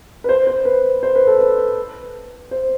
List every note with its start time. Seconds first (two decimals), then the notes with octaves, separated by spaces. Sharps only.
0.24 B4
0.29 C5
0.47 C5
0.65 B4
1.03 C5
1.16 B4
1.27 A4
1.39 B4
2.51 C5